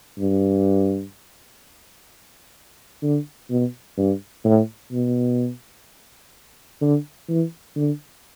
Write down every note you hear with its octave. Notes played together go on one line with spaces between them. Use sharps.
G2
D3
B2
G2
A2
B2
D3
E3
D3